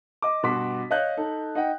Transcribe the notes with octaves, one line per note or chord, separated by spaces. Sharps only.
D#5 D6
G2 B2 F#4 C6 D6 B6
C#5 D#5 F5 F#6 G6
D#4 A4
D#4 D#5 F#5 G5